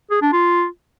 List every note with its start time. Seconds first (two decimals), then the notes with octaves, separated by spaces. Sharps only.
0.11 G#4
0.22 D4
0.33 F4